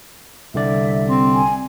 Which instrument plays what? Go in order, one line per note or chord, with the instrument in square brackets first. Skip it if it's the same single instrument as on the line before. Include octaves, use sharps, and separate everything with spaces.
[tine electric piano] C2 D3 D5 [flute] E5
[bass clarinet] C4
[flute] G#5